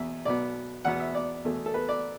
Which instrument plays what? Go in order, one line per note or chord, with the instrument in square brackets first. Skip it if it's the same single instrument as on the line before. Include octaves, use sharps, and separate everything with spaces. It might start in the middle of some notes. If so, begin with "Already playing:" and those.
Already playing: [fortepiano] E2 B2 E5
B1 B2 B3 D5
E2 B2 B3 F#5
E5
D5
E2 B2 A3
A4
B4
D5